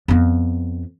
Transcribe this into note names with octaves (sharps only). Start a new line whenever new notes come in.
F2 B3